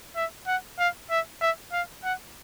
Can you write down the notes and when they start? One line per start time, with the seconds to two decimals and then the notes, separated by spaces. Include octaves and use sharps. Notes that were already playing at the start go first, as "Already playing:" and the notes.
0.16 E5
0.47 F#5
0.79 F5
1.10 E5
1.41 E5
1.72 F5
2.04 F#5